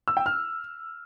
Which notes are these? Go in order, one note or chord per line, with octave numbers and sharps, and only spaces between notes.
E6
G5
F6